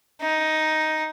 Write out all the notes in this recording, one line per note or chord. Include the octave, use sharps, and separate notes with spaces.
D#4